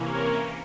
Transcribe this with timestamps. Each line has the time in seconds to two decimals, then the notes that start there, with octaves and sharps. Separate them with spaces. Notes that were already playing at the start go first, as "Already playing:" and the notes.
Already playing: C3 E3 A#3 C#4
0.12 A#4 C#5